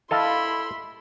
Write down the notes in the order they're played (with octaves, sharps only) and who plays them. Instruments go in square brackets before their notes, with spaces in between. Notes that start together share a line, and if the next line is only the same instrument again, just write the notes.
[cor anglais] E4 [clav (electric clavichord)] A4 D#5 F5 [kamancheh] B5 C6